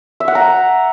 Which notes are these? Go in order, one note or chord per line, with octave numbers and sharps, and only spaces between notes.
E5
F#5
A#5